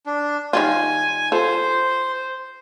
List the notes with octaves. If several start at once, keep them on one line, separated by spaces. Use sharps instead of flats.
D4
D#3 G3 F4 G#5
F4 A4 C5